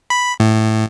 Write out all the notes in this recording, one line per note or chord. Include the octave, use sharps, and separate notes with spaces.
B5
A2